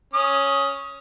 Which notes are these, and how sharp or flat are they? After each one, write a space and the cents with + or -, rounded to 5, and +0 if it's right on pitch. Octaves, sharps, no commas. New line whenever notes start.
C#4 +0 D#6 +15